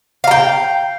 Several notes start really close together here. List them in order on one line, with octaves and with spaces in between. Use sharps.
F5 A#5 G5